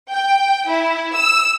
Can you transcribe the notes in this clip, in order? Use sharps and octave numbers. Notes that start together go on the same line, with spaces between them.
G5
E4
E6